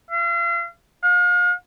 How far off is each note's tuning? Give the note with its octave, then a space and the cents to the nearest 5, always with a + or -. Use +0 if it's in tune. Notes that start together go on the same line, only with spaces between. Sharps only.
F5 -40
F5 +40